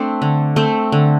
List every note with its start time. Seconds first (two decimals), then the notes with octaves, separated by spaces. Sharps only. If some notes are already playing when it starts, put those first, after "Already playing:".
Already playing: A3 C4 D4
0.22 D3
0.56 A3 C4
0.92 D3